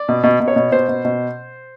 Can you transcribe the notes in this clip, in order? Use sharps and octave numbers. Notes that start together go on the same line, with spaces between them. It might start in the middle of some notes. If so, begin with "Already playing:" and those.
Already playing: D5
B2
B2
B2
C#5
B2
B2 C5
B2
B2